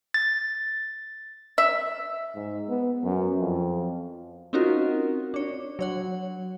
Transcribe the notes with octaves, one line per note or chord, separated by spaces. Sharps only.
A6
E5
G#2
B3
F#2
F2
C4 C#4 D#4 F4 F#4 A#4
D4 C#5
F#3 C#5 F#5